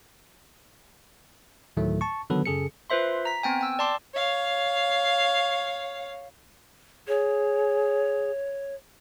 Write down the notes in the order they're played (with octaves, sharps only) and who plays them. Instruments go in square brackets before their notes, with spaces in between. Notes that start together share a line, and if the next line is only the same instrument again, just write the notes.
[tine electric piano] D2 A2 D#3 F#3 A3
A5 C#6
D3 D#3 F#3 B3 A4 B4
F#2 C#3 G#4 A4 C#7
[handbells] F4 B4 C5 E5 C6
A#5 B6
B3 C4 G5 G#5
G5 E6
D5 A5 C6 D6
[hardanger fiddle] C#5 F5
[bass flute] G#4 [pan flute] C#5